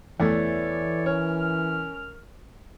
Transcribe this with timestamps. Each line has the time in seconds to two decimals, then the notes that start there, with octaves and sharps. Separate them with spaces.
0.20 E2 E3 A3 A4 C#5 D5
1.06 C#4 A#4 C#5 F6